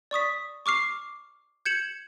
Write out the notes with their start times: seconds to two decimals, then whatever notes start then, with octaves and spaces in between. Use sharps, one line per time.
0.11 D5 C#6 D#6 B6
0.66 C#6 D6 F6 C7
1.66 G6 G#6 C#7 E7 F#7